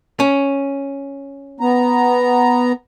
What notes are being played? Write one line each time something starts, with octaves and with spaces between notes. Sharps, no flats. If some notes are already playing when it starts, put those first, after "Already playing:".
C#4
B3 A#5